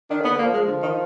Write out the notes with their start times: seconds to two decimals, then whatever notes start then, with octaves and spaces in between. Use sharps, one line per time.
0.10 D#3 D4
0.21 D3
0.24 B3
0.32 D3
0.39 A#3
0.43 F3
0.53 F3 G#3
0.67 D3
0.82 D#3